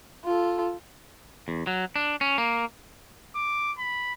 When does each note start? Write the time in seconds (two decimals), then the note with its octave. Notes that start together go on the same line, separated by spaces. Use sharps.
0.25 F4 A4
1.48 E2
1.67 F#3
1.96 D4
2.21 C#4
2.38 A#3
3.35 D6
3.78 B5